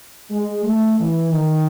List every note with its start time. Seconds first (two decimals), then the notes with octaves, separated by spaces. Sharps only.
0.31 G#3
0.64 A3
0.99 E3
1.33 D#3